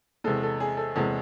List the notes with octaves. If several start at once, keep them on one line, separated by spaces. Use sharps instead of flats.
E2 C3 G#3 A4
A4
G#4
A4
E2 C3 G#3 A4